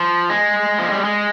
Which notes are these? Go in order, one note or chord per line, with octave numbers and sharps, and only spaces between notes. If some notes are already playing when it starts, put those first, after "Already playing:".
Already playing: F3
G#3
F3
G3
G#3